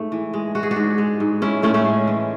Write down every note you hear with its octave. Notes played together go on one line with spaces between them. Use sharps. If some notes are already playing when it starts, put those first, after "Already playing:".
Already playing: G#2 A3
E3
G#3
G#3 F#4
G#4
D4 F#4
G#2
G#3
G#2
G#3 C#4 E4
A2 A3 C#4
A3 C#4
G#3
E3